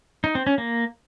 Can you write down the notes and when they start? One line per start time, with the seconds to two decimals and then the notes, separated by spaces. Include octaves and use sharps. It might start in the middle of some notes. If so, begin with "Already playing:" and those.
0.24 D#4
0.35 C4
0.47 C#4
0.58 A#3